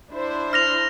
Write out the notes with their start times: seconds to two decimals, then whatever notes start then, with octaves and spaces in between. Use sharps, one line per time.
0.11 D4 E4 C5
0.53 F6 A#6 F7